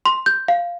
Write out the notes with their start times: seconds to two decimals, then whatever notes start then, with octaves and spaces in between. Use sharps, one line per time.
0.05 C6
0.26 G6
0.48 F5